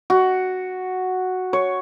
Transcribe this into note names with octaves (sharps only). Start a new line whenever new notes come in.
F#4
C#5